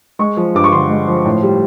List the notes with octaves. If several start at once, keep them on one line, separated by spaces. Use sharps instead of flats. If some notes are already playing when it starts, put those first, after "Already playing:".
G#3 C#6
F3
G2 D6
C#6
D3 C6
G#3
F3
A2
G3